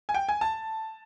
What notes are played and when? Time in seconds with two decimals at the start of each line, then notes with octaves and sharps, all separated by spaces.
0.09 G#5
0.14 G5
0.29 G#5
0.41 A5